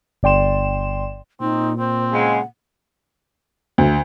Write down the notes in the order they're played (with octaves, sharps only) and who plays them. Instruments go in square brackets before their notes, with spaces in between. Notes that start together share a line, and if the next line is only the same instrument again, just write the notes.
[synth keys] G1 D5 G5 C6 E7
[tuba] A#2 [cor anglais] C4 [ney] D#4
[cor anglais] C4 [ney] C5
[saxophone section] C#3 G#3 [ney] F#5
[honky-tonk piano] D2